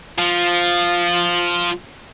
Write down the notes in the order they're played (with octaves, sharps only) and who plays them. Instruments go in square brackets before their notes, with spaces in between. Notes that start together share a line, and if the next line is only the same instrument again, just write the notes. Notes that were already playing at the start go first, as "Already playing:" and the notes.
[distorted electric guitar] F3 [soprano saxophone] F4